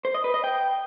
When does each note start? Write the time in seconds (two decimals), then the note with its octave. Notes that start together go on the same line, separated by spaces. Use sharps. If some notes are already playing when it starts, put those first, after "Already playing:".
0.05 C5
0.14 D#5
0.24 B4
0.34 D#5
0.44 G5